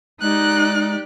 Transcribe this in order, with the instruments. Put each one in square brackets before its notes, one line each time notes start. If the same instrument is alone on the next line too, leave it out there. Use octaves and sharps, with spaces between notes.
[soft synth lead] G#3 [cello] D#4 [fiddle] G4 D5 [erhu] F#6